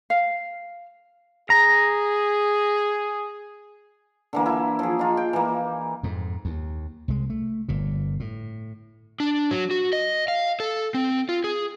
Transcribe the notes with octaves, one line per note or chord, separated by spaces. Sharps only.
F5
G#4 A#5
D3 E3 A#3
E4
F3 G#4
D#4 F4
G5
E3 A#3
F2 G#2
D#2
C2 G#3
A3
G1 A#2
A2
D4
F#3
F#4
D#5
F5
A4
C4
F4
G#4